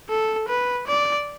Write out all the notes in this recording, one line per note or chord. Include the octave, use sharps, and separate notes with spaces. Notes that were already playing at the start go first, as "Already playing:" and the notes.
A4
B4
D5